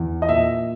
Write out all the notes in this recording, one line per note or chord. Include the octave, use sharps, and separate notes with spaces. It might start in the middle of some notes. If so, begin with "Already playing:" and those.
Already playing: E2
D#5
A#2 E5